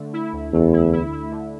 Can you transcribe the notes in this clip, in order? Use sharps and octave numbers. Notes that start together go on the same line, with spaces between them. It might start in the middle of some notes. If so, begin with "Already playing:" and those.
Already playing: D3 A3
E4
D2
E2 A3
E4
E4
E4
D3